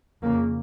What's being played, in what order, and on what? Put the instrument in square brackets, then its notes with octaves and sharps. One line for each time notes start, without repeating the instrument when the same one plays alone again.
[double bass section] F2 C#3 A#3